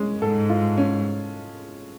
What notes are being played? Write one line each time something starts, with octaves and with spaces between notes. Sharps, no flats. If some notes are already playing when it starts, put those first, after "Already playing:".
Already playing: G#3 C#4
G#2 A4
F4
C#4